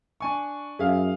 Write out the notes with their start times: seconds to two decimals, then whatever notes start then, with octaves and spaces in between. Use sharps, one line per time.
0.20 D4 G#5 C#6
0.79 F#2 G#4 E5 F5